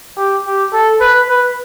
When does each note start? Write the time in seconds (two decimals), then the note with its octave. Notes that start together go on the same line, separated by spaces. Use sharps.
0.17 G4
0.45 G4
0.73 A4
1.01 B4
1.29 B4